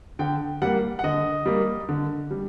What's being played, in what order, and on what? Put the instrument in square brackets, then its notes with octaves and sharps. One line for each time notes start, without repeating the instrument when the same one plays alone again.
[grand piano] D3 G5
G3 A#3 F#5
F#5
D3 D#5
G3 A#3
D3
G3